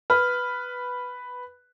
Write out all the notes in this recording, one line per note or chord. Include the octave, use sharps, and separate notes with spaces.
B4 F6